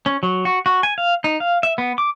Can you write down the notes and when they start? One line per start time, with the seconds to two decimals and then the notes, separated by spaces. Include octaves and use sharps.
0.06 C#4
0.23 F#3
0.45 F#4
0.66 F#4
0.83 G#5
0.98 F5
1.24 D#4
1.40 F5
1.63 E5
1.78 B3
1.98 D6